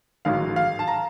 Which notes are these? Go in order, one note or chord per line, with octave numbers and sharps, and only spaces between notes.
A1 G#2 D#3 F#3 F5
F5
A5
A#5